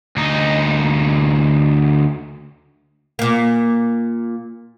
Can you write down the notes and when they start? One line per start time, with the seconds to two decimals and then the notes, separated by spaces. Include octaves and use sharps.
0.17 D2 D#4
3.19 A#2 A#3